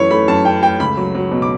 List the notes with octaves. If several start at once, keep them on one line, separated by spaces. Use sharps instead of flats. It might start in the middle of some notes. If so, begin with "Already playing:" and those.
Already playing: F#2 E3 A3 C#4 C#5 B5
A3 B5
F#2 A5
C#4 G5
A3 G5
C#2 B5
F#3
F#3
B2
D6